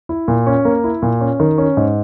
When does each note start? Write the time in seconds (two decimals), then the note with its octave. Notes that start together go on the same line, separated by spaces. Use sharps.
0.09 E4
0.28 A#2
0.46 C#4
0.65 A#3
0.84 E4
1.02 A#2
1.21 C#4
1.40 D#3
1.58 C#4
1.77 G#2